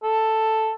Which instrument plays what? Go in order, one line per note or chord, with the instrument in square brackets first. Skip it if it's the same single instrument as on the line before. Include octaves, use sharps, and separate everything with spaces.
[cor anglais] A4